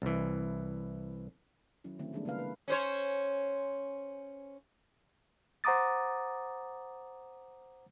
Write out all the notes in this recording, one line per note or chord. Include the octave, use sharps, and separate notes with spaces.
C2 E3
D#3 F#3 C#4 E4
D3 D#3 A3 C4 E4
E3 G3 G#3 A#3 D4 G#4
C#3 A#3 E4 B4 F5
B4
C#4 C5 C#5
C5 F#5 A#5 D6 D#6 A6